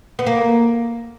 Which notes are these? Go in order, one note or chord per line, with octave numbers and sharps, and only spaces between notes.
B3
A#3